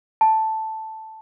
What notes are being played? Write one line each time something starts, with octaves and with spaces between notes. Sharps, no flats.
A5